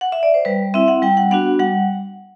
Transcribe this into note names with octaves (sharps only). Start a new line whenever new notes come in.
F#5
E5
D5
C5
G3 B4
C4 E4 E5
F#5
G3 G5
F#5
B3 D4 F#4 F#5
G3 F#5